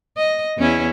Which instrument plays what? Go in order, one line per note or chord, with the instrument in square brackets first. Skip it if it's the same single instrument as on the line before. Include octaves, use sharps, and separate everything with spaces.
[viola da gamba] D#5
E2 C#4 E4